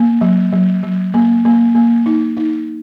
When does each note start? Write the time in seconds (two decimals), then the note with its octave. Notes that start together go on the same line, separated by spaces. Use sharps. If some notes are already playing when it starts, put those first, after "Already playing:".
Already playing: A#3
0.21 F#3
0.53 F#3
0.83 F#3
1.14 A#3
1.45 A#3
1.75 A#3
2.06 D#4
2.37 D#4